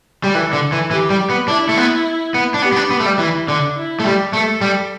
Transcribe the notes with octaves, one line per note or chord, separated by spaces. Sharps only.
G3
E3 A4
D3
E3
E3 G4
G3
B3
D4 E4
A3
B3
B3
D4
B3 G4
B3
D4
B3
A3
G3
E3 E4
D3 D4
E4
A3
G3 G4
A3 A4
G3